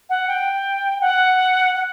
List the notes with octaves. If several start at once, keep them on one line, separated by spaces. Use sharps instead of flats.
F#5
G5
F#5
F#5